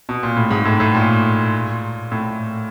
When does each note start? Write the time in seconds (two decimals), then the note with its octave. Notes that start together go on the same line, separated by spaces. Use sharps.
0.09 B2
0.23 A#2
0.37 A2
0.51 G#2
0.65 A2
0.80 A2
0.95 A#2
2.12 A2